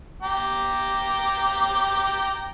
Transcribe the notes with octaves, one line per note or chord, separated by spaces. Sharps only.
G5 A#5 D6